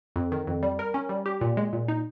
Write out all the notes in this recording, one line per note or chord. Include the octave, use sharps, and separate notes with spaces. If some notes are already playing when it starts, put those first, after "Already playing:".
F2
D#3
F2
G3
A#4
C#4
G3
G4
A#2
G#3
A#2
D#4